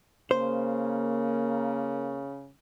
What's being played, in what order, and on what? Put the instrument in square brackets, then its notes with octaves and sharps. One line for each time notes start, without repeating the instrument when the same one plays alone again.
[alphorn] C#3 [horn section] A#3 [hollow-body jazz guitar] C5